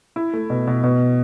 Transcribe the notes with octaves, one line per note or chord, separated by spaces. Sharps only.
E4
A3
B2
B2
B2